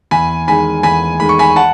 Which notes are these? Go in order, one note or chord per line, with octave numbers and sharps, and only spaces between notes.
E2 G#5 B5
D#3 G#3 G#5 B5
E2 G#5 B5
D#3 G#3 B5
C#6
G#5 B5
F#5 A5